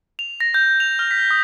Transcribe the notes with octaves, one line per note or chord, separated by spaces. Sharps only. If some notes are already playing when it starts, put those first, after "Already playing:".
F7
A#6
G6
F7
F6
B6
D#6